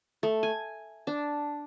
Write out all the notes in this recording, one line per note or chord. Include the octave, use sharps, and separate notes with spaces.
A3
G#5
D4